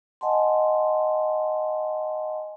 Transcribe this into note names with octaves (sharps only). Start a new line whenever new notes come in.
D#5 F#5 G#5 A5 C6